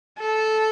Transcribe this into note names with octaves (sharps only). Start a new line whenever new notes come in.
A4